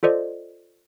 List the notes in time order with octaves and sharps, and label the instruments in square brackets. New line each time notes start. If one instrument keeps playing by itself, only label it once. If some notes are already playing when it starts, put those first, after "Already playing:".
[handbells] F4 A4 C5 D5 D#5